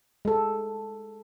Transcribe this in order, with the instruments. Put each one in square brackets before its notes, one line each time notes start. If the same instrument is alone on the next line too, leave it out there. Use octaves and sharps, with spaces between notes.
[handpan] G#3 A4